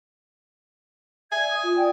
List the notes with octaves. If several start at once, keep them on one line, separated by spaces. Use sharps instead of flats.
D5 E5 G#5 G#6
D#6
F4
D5 G5